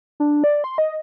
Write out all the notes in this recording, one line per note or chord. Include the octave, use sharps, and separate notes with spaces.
D4
D5
C6
D#5